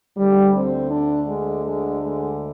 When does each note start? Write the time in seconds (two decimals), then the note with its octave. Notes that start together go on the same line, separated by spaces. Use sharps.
0.17 D2 D3 G3
0.54 C4
0.90 D4
1.27 G#3
1.65 G#3
2.02 G#3